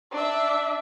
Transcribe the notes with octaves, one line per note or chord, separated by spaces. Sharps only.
D4 E5